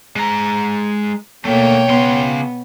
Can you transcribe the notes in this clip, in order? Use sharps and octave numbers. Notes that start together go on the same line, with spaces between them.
G#3 A#5
B2 D3 A3 A#3 C#5 G5
C#3 B3 C6